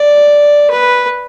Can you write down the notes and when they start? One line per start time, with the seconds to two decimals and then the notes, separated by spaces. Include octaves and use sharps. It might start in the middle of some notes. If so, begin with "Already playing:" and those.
Already playing: D5
0.71 B4